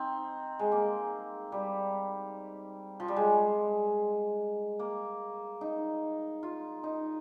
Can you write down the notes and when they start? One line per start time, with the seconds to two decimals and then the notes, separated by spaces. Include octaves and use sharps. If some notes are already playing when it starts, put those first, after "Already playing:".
Already playing: C4 D#4
0.59 G#3
0.72 A#3
1.52 G3
3.00 F3
3.08 G3
3.16 G#3
4.79 A#3
5.61 D#4
6.43 F4
6.84 D#4